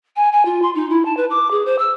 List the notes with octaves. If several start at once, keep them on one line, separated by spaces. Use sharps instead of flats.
G#5
G#5
F4
C6
D#4
E4
A5
B4
D6
G#4
C5
E6